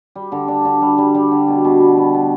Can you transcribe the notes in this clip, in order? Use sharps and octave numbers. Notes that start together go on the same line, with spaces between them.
G3
D3
D4
D3
G3
G3
G3
D3
B2
B2
B2
B3
B3